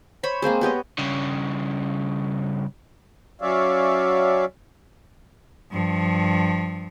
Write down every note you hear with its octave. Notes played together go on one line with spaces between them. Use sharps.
C5 C#5 B5
G#3 A#3 C4 G#4
B3 G4 C#5 D#5
G2 C#3
F#3 C#4 C#5 D5 E5 F5
G2 F3